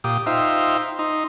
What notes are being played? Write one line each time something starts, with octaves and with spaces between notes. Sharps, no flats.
A#2 G4 D#6
D#4 F4 C5 E5 G5
D#4 C6